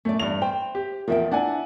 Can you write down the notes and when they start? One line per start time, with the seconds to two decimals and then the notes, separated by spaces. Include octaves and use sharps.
0.05 F#2 A3 D5
0.20 E2 G2 F7
0.42 C5 G5
0.75 G4
1.08 E2 F3 A#4 E5 G5
1.31 D4 E4 D5 F#5 G#5